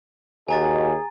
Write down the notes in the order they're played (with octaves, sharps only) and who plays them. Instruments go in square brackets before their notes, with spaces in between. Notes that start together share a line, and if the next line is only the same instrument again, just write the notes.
[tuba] D#2 [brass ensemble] F#4 D#5 [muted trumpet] G#4 [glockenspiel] G#5 A#5 A6